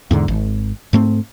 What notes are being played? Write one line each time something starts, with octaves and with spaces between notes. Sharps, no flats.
E2 G#2 D3
G#1
G#2 A3 C4